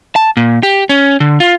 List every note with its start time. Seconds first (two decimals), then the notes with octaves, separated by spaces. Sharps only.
0.16 A5
0.37 A#2
0.63 G4
0.89 C#4
1.20 D3
1.40 F4